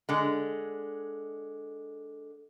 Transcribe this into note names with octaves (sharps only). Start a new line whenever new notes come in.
D3 G#3